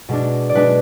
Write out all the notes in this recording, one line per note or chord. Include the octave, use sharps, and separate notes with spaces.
B2 G#3 D4
D5
B2 G#3 D4 B4